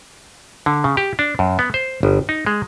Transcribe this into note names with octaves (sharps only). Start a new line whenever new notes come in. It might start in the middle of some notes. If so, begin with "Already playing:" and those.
D3
C#3
G4
D4
F#2
B3
C5
G1
D#4
G#3